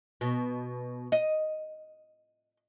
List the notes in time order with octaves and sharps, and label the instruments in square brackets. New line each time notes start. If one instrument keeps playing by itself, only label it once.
[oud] B2
D#5